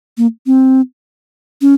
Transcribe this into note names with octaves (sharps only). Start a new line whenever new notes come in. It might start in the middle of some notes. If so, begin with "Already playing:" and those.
A#3
C4
C#4